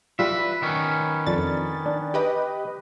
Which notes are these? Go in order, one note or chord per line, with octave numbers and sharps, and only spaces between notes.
G3 F4 B4 E5
D#3 B3 C#4
F2 D4 A6
D4
G4 B4 D#5